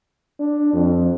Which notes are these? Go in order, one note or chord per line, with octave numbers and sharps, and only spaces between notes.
D4
F2